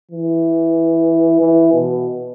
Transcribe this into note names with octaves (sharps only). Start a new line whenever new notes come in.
E3
E3
B2